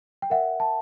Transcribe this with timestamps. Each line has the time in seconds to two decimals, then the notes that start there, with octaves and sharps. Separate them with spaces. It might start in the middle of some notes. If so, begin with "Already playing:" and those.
0.22 G5
0.30 A#4 E5 F#5
0.60 A5